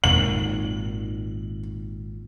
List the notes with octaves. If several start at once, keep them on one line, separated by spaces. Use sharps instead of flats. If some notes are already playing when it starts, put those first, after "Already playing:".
G#1 A#2 D#3 F#7